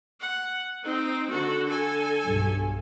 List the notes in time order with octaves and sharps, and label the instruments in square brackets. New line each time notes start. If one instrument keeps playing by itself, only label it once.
[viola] F#5
[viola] C4 [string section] D#4
[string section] D3 [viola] F#4 A4
[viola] A4 G#5
[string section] B1 G2